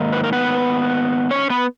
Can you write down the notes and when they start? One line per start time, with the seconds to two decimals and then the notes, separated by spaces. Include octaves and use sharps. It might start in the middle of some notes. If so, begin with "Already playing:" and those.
Already playing: G#2 D#3 A#3
0.13 B4
0.24 A#4
0.33 B3 B4
1.31 C#4 C#5
1.50 B3 B4